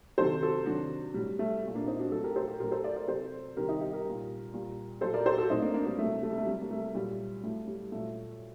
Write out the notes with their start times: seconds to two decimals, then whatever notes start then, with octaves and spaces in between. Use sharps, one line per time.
0.18 C3 D#3 F#3 A4 C5
0.42 F#4 A4
0.66 C3 D#3 F#3 D4 F#4
1.14 A2 F#3 G3
1.39 A3
1.63 A#2 G3
1.75 A#3 D4
1.87 C4 D#4
1.99 D4 F#4
2.11 A2 F#3 F#4 A4
2.23 G4 A#4
2.36 A4 C5
2.48 G4 A#4
2.60 A2 F#3 G4 A#4
2.71 A4 C5
2.84 A#4 D5
2.96 A#4 D5
3.08 C3 F#3 A4 C5
3.56 C3 D#3 G3 G4 A#4
3.68 D#4 G4
3.80 D#4 G4
3.93 G4 A#4
4.05 A#2 G3
4.53 A#2 G3
5.01 A#2 F#3 A4 C5
5.14 A#4 D5
5.26 A4 C5
5.38 F#4 A4
5.50 A2 F#3 C4 D#4
5.62 A#3 D4
5.74 A#3 D4
5.86 G3 A#3
5.98 C3 F#3 A3
6.23 A3
6.30 G3
6.38 A3
6.46 C3 F#3 G3
6.62 A#3
6.71 A3
6.94 A#2 F#3 G3
7.43 A2 F#3 A3
7.67 G3
7.92 A#2 F#3 A3